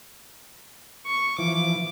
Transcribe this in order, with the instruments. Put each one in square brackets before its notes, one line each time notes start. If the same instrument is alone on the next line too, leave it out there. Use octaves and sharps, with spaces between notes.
[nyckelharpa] C#6
[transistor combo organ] E3 F3 [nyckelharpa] D6